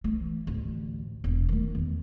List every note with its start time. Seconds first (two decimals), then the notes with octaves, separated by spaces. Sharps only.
0.04 E3 A3
0.47 A1 D2
1.24 E1
1.49 D#3 A3
1.75 E2 C#4